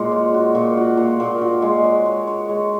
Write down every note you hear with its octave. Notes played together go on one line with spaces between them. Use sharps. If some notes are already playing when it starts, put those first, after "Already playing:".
Already playing: A#2 G#3 F#4
C#5
F#4
A#2
F#4
A#2
A#2
F#4
G#3
C#5
C#5
C#5
G#3